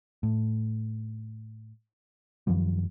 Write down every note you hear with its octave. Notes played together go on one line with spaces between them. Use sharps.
A2
F#2 D#3 F3 G3